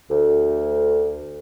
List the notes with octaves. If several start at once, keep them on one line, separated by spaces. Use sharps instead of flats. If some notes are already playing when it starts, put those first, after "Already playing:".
D2